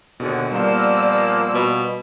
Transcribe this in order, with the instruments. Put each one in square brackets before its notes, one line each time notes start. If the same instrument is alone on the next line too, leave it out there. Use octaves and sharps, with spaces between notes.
[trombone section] D#2 D3 [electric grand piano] B2 G#4
[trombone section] A#2 F3 A#3 [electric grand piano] G3 B3 [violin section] D5 E6
[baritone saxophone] B2